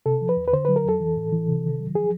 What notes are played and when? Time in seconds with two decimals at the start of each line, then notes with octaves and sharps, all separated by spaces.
0.06 C3 A4
0.21 F3
0.29 B4
0.37 E2
0.48 B4
0.53 D3 C5
0.65 F#3 B4
0.76 A#4
0.85 F2 A4
1.00 E3
1.16 A2
1.32 E3
1.48 C3
1.64 D#3
1.79 F#3
1.95 F3 G#4